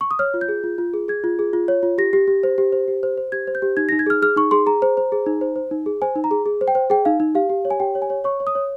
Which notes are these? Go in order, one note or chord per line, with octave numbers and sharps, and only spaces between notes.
C#6
D#6
C#5 F6
F4
G6
G#4
F4
F4
G#4
G#4 G#6
F4
G#4
F4
C#5
F4
G4 A#6
G4
G4
C5
G4
C5
G4
C5
C5
G4 G#6
C5
G6
G4
D#4 G#6
A#6
D#4
G#6
G#4 F6
G#4 F6
D#4 C#6
G#4 C6
G#4 A#5
C5
C5
G#4
D#4
C5
C5
D#4
G#4
C5 G#5
D#4
A#5
G#4
G#4
C5
G5
C5
G#4 G5
D#4 F5
D#4
G4 F5
G4
C#5
G#5
G4 G5
C#5
G#5
C#5
C#5 C#6
C#5
D#6
C#5